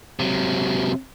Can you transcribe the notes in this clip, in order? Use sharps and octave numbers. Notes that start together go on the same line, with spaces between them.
C3 F#3